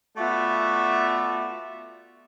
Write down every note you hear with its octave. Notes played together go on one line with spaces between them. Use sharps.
A3 B3 F4 F#4 D5 E5